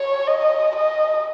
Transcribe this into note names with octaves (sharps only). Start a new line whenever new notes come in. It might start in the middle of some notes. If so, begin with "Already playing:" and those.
Already playing: C#5
D#5
D#5